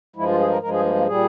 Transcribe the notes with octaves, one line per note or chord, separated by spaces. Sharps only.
G2 F3 G#3 E4
F4
G#4
A#4
G2 F3 G#3 A#4
G#4
A#3
A#3
A#2 G3 G#4